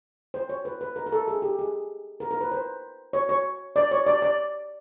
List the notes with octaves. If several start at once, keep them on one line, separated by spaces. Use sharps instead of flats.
C5
C#5
B4
B4
A#4
A#4
A4
G#4
G4
G#4
A#4
A#4
B4
C5
C#5
C#5
D5
C#5
D5
D5